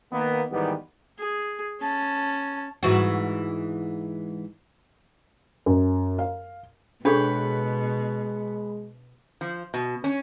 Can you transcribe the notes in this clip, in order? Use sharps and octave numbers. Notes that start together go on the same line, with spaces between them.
D#3 A#3 B3
G#2 D#3 E3 G3 B3 G4
G#4
C#4 A5
G#2 E3 F#4
F#2
F5
B2 G#3 D4 G#4 A4 B4 C#5 G5
F3
B2
C#4